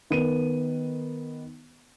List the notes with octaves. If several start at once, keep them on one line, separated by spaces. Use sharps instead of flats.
D#3 B3 D#7